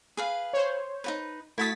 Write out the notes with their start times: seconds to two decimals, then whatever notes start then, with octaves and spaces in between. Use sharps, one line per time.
0.17 G#4 B4 F5
0.53 C5 C#5
1.04 D#4 F#4 B4
1.58 A3 E4 F#4 D#6 A6 B6